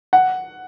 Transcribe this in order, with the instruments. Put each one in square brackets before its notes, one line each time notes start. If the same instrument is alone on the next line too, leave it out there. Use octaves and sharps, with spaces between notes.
[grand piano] F#5